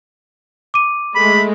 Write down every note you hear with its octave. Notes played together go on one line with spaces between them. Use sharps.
D6 D#7
G#3 A3 B5